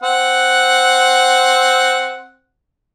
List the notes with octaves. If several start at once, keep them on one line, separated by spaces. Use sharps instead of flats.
C4 F#5